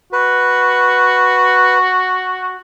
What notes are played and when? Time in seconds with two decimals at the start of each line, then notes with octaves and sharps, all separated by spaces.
0.13 F#4 B4